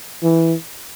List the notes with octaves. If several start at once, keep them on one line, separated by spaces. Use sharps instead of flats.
E3